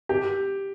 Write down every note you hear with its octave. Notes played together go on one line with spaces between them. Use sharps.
G4